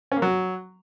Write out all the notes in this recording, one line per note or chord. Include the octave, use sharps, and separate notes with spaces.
C#4
A#3
F#3